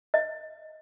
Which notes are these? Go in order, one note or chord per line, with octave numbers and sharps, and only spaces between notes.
D#5